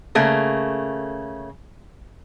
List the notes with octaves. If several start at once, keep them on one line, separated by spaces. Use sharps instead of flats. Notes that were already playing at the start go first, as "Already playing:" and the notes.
C#3 A3 A#3